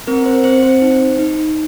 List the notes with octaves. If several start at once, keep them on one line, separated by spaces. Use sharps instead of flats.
C4 A#4
C5
C4 C5
C5
D#4
D#4